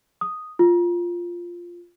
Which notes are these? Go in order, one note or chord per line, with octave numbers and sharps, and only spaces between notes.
D#6
F4